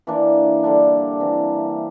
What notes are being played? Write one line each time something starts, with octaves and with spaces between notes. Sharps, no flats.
E3 A#3 D4
D3 G3 D4
C3 E3 A#3